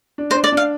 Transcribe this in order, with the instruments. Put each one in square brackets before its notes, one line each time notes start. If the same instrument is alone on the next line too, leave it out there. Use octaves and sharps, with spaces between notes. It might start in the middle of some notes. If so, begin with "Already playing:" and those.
[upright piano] D4
[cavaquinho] C5
[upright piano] D4
[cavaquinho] D5
[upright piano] D4 [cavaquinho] F5